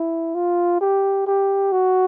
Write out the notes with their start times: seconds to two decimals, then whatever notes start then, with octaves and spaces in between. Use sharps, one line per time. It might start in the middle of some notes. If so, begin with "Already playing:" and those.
Already playing: E4
0.35 F4
0.81 G4
1.27 G4
1.72 F#4